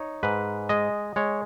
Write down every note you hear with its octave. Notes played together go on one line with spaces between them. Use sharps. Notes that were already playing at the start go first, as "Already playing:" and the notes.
Already playing: D#4 C#5
G#2 B4
G#3 D#5
G#3 C#5